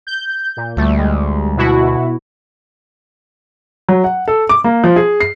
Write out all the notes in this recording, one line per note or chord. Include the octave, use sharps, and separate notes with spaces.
G6
A#2
D2 G3 A3
G3 G#3
B2 E4 F#4
F#3
F#5
A4
D6
A#3
F3
G#4
C7